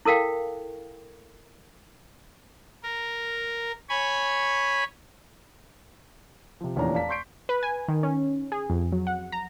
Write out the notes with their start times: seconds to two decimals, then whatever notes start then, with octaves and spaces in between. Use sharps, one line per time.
0.05 E4 A4 A#4 F5 G5
2.83 A#4
3.89 C#5 G#5 B5
6.61 C3 F3
6.76 F1 E2 A#2 C#4 D4 A#5
6.95 D5 F5 A5 A#5 B6
7.09 C6 C#6 G6 C7 D7
7.49 B4
7.63 G#5
7.88 D#3
8.03 C#4
8.52 G#4
8.70 F2
8.92 F#3
9.07 F#5
9.32 A#5